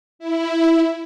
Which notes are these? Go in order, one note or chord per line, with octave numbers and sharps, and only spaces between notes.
E4